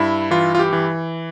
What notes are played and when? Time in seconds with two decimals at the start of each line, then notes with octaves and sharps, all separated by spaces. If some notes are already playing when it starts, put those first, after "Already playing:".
Already playing: G2 E4
0.31 E3 F4
0.55 F4
0.59 G4
0.73 E3